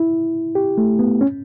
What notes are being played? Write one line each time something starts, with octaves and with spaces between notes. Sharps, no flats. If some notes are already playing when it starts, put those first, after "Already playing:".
Already playing: E4
G4
A3
B3
C#4